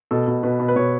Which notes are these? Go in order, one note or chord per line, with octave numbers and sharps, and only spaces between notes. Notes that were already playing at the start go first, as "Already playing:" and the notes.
B2 A4
B2
B2 B4
B2
B4
B2 C#5